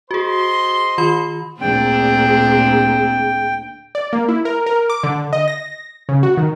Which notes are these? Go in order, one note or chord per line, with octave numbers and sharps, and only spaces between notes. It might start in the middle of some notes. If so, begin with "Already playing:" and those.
F#4 G#4 C5 D#5 C6
D#3 F4 B5
D2 A#2 C4 D4 G#4 G5
D5
A#3
E4
A#4
A#4
D6
D3
D#5
A#6
C#3
F#4
D#3